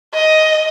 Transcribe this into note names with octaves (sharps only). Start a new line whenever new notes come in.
D#5